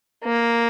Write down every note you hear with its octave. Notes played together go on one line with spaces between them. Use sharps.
A#3